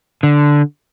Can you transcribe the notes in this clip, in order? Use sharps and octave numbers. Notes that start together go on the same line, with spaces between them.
D3